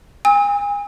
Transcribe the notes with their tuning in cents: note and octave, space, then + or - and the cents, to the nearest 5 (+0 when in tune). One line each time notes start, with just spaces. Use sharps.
G#5 -35 E6 -45